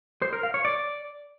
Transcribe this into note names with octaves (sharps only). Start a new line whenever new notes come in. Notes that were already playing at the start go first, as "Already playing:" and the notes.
C5
A#4
F5
C#5
D5